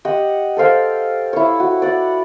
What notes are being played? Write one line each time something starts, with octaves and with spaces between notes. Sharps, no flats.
G4 D#5 F#5
A4 C5 F5 G5
E4 C#5
F#4
D5 F#5